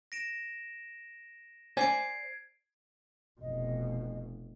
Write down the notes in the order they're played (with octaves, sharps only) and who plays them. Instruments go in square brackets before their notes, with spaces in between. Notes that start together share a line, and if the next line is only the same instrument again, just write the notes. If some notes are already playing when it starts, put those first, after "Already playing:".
[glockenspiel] A#6 D7 E7
[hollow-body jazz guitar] C5 D5 G#5 [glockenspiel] G#6 C7 D7
[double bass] F1 B2 [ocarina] D#5